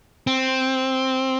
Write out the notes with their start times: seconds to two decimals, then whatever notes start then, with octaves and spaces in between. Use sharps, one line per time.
0.27 C4